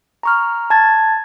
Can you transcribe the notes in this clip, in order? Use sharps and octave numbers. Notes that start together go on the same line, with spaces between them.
A#5 C#6 F6
A5 G#6 A6